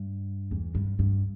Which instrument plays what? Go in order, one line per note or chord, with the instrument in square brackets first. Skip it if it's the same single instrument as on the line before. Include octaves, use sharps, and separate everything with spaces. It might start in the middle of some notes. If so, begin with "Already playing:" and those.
Already playing: [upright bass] G2
E2
G2
G2